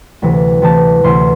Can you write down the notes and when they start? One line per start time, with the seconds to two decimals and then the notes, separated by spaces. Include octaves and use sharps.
0.22 D2 C3 E3
0.62 D2 C3 E3 A5
1.04 D2 C3 E3 C6